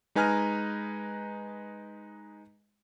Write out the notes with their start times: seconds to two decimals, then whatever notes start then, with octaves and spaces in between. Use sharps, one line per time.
0.15 G#3 D#4 B4 G#5 A#5 F6